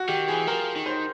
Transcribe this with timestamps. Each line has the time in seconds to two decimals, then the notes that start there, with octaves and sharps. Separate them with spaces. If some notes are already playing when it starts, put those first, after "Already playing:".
Already playing: F#4
0.08 D#3 G4
0.28 E3 G#4
0.47 F3 A#4
0.76 D#3
0.86 C5